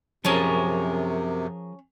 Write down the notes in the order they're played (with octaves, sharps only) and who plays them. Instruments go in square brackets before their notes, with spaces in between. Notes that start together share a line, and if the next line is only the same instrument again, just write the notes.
[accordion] F#2 C3 [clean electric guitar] F3 G#4 A#4 [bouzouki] C#4 A5